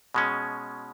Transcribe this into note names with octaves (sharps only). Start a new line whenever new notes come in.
B2 G#3 C#4